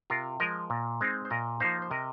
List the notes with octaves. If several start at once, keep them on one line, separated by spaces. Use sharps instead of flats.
C3 F4 A#4
F3 G#3 A#4 D#5
A#2
G#3 C4 D#4
C5
A#2 A#4 D#5
F3 A#3 D#4 C5 F5
C5
C3 A#4 D#5